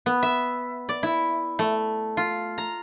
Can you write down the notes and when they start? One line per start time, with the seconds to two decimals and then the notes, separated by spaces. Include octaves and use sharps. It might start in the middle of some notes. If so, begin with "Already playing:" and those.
0.06 B3
0.23 E5
0.89 D5
1.03 E4
1.59 A3
2.17 F4
2.58 A#5